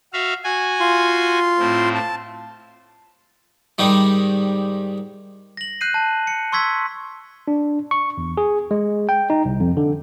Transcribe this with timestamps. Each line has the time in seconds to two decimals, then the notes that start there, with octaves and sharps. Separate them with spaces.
0.13 F#4 E5 F5
0.44 F#4 G#5
0.80 F4 C6
1.59 A2 C4
1.95 A5
3.78 G#2 D#3 G3
5.57 A#6 F#7
5.81 F#6 G6 C7 D#7
5.94 A5
6.27 C#7
6.52 C6 C#6 E6 G#6 B6
7.48 D4
7.91 C#6
8.18 E2
8.37 G#4
8.71 G#3
9.09 G5
9.30 D#4
9.45 C2
9.60 F2
9.77 D3